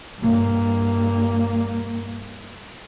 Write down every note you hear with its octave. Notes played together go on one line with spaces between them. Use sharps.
G2 A#3